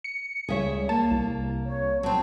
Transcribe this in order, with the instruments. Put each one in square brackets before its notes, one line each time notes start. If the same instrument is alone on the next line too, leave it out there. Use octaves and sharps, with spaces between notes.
[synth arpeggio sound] C#7
[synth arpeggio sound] C#2 G3 C#5 [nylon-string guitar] G#4 E5
[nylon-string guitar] A#3 [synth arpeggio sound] A5
[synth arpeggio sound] C2
[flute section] C#5
[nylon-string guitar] F#3 C4 [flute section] A5